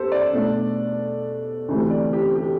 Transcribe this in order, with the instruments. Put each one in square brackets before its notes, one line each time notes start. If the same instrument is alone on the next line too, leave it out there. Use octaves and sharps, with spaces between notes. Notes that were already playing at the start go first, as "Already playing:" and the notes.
Already playing: [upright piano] E2 G4 A4 C5
D5
B2 A3 D4
D2 C3 E3 A3
D5
G4
G4